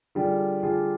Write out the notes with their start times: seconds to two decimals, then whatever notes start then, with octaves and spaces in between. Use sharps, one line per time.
0.15 D3 G3 D4 F4 G#4
0.63 D3 G3 D4 F4 G#4